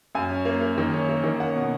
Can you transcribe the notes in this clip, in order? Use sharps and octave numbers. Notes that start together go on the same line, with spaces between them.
F#2 G#5
C#4
A#3
A#3
D#3
C#4
A#3
D#3
C#4 F#5
B2